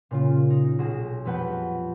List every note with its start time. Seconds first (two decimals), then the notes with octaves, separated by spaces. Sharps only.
0.11 A#2 C#3 F4
0.50 D#4
0.79 B1 F#4 G#4 E7
1.25 F2 G3 B3 B4 F#5 G5